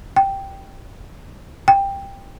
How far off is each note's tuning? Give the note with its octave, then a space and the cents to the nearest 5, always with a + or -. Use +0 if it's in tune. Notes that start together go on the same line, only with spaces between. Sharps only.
G5 -5
G5 +10